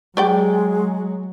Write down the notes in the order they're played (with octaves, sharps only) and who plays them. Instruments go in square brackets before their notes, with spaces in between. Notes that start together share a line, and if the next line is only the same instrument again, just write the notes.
[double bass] F#3 [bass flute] G#3 [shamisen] G4 D5 G5